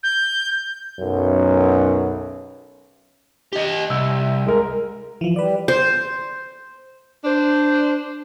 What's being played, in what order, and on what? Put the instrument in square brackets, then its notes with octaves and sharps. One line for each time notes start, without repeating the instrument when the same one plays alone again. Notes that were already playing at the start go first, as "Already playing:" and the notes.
[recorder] G6
[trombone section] B1 F#2
[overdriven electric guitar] G4 D#5
[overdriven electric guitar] C2 [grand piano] E6
[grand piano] G#3 A#4
[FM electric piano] E3 F3
[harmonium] G3 [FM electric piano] B4 D5
[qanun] C5
[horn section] D4 C5